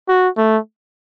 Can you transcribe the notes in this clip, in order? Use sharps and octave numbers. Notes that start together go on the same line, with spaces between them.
F#4
A3